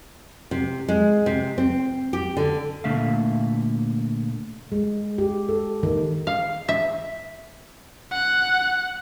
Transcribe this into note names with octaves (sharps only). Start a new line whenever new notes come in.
C3
G#3
C3
C4
G4
D3
A#2 D3 A3 E5 F5
G#3
G4
A4
D#3
F5
E5
F#5 F#6